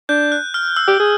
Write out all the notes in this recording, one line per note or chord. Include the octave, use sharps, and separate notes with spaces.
D4 G6
F#6
F6
E6
G4
G#4